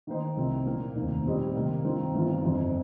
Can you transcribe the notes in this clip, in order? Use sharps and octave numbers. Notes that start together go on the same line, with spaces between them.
D#3 A#3 D#4 C5 D#5
C2 C3 F3 C4
A#2 A#3 D#4
F1 D#2 D#3 C4
A#2 G3 C4 G4 D#5
C3 D#3 A#3 D#4
G2 D#3 C4 F4
G1 G2 D#3 C4 F4
G1 F2 F3 C4 F4